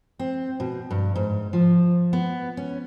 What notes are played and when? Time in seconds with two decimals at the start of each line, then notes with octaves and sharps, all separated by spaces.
0.19 C4
0.60 B2
0.91 G2
1.16 G#2
1.53 F3
2.13 B3
2.57 C#4